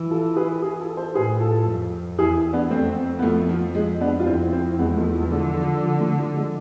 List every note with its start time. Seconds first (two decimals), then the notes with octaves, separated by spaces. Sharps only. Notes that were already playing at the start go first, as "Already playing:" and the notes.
Already playing: E3
0.10 F4 A4
0.36 G#4 B4
0.62 E4 G#4
0.80 F4 A4
0.97 A4 C5
1.14 A2 G#4 B4
1.40 F4 A4
1.66 F2
2.19 E2 E4 G#4
2.53 B3 D4
2.70 F2 A3 C4
3.19 B3
3.22 F3 A3
3.49 F3
3.75 G#3
4.01 B3 D4
4.20 F4
4.26 F2 C4 E4
4.53 C4 E4
4.79 E2 G#3 B3
4.89 G#3
4.96 F3 A3
5.14 F3
5.31 D3 G#3
5.57 F3
5.83 F3
6.00 F3 A3
6.18 F3
6.35 G#3